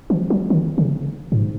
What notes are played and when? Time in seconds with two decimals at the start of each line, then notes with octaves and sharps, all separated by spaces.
0.10 E3
0.30 F#3
0.50 D#3
0.78 C#3
1.32 G#2